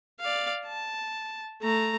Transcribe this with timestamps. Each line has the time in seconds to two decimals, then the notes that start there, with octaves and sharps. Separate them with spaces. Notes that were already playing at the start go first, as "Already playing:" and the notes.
0.21 D5 F5
0.66 A5
1.61 A3 A#5